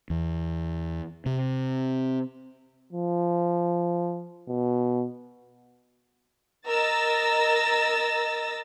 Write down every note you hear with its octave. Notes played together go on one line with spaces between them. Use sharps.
E2
C3
F3
B2
A#4 D#5 E6 A6 A#6